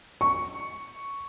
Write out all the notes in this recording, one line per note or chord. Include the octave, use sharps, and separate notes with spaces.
C#6